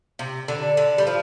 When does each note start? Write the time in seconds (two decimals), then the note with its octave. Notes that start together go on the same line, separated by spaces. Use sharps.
0.19 C3
0.48 D3
0.77 D3
0.98 G3
1.07 F3